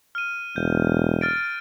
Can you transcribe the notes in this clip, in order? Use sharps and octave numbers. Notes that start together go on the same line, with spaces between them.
F6 D#7
E1 G6
F6 A6 D7